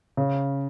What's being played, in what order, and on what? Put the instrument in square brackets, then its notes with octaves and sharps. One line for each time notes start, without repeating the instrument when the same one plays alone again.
[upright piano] C#3